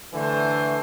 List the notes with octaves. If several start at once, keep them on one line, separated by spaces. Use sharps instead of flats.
D3 E3 A3 C5